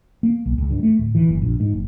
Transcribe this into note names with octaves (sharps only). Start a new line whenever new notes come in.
A#3
B1
C#2
G2
A3
D1
E3
F#1
A#1
G#2
F#1